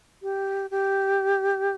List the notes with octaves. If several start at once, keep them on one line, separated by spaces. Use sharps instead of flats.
G4
G4